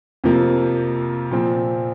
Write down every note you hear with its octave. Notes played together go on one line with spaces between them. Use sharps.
F2 C3 F3 A#3
A#2 F3 C4